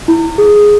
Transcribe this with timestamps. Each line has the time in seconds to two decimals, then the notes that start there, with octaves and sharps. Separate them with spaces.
0.08 E4
0.38 G#4